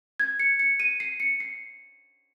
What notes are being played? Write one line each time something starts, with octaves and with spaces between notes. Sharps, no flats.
G#6
C#7
C#7
D#7
C7
C#7
C7